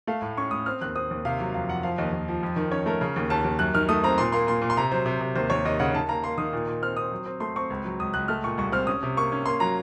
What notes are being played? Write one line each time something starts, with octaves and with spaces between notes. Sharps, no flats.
A3 F5
A2
C#4 C#6
A2 D#6
C4 F6
D#2 F#6
C4 D#6
D#2
C3 F5
F#3
F2 F5
F2 F#5
F3 F5
D#2 D#5
D#2
F3
F2
D#3
C#4 C#5
A3 A#4
C#3
D#2
D#2 A5
D#2
F#2 F#6
D#3 F6
A3 D#6
C4 A#5
A#2 C6
A#3 C6
A#2 C6
A#2
C6
C3 A#5
F#3 C5
C3
C3
D#2 C5
D#2 C#5
D#2 D#5
C#3 F#5
D#3 A5
A#3 A#5
A#3 C6
D#3 D#6
A#2
A#2
C4 F6
C4 D#6
F#3
C4
A3 C6
C4 C#6
C#2
F#3
C#2 D#6
C#2 F#6
A3 F6
A#2 C#6
C2 C#6
C4 F6
C#4 D#6
C3
A#3 C#6
C#4
A#3 C6
F#3 A#5